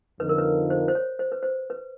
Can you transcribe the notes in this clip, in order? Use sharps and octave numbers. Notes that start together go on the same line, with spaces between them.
F2 D3 F3 A#3 D#4 B4
A#4
B4
C5
C5
C#5
C5
B4
C5
B4